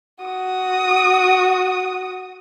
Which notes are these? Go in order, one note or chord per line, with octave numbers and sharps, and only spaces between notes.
F#4 D#6